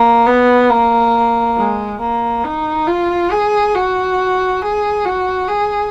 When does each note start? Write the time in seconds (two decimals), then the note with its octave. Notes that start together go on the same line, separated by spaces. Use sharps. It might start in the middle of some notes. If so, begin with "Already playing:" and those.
Already playing: A#3
0.26 B3
0.70 A#3
1.56 G#3
2.00 A#3
2.44 D#4
2.87 F4
3.31 G#4
3.75 F#4
4.62 G#4
5.05 F#4
5.48 G#4